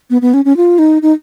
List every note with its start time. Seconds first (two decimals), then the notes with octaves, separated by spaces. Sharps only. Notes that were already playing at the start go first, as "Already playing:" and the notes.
0.10 B3
0.22 B3
0.34 C#4
0.45 C#4
0.57 F4
0.79 D#4
1.02 D#4